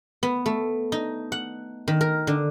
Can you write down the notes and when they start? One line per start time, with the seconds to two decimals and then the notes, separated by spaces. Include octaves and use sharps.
0.23 B3
0.46 A3
0.92 D#4
1.32 F#5
1.88 D#3
2.01 A#4
2.27 D3